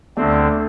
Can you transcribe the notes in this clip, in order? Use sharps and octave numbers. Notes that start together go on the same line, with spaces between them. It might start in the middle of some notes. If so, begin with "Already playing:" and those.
D2 D3 A3 C4 D4